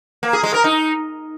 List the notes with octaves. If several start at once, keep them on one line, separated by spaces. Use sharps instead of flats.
A#3
G#4
G#3
A#4
D#4